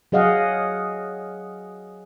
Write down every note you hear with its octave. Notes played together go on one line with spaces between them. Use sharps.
F#3 G#4 D#5 F5 F#5